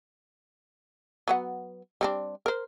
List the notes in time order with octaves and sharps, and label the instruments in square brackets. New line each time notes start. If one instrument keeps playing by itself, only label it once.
[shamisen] F#3 B3 F#5
G3 C4 D4
A#4 C5